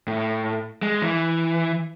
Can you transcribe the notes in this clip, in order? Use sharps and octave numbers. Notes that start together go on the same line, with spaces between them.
A2
G#3
E3